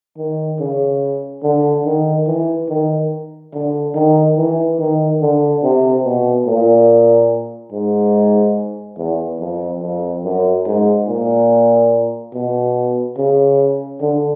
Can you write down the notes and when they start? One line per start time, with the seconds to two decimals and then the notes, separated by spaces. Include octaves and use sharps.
0.17 D#3
0.59 C#3
1.43 D3
1.85 D#3
2.27 E3
2.69 D#3
3.53 D3
3.95 D#3
4.37 E3
4.79 D#3
5.21 D3
5.63 C3
6.05 B2
6.46 A#2
7.73 G#2
8.98 E2
9.40 F2
9.82 F2
10.24 F#2
10.66 G#2
11.08 A#2
12.34 B2
13.18 C#3
14.01 D3